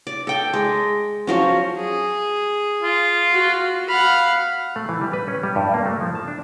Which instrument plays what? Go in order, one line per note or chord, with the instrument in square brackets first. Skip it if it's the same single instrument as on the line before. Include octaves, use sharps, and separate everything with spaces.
[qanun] D5
A4 G5
G#3
F3 F#3 C#4
[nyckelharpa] G#4
[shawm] F4
[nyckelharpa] F#4
[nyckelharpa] F5 F#5 [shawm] B5
[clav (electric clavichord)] A3
E3
G3
B4
C#4
G3
G2
A#3
A3
F3
A5
D4